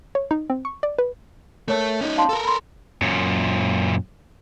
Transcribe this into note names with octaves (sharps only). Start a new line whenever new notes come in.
C#5
D#4
C4
C#6
D5
B4
A3 A4 A#4 C#5
C#4 D#4
F5 A5 C6
A4 A#4
B5 C6
F#2 A#2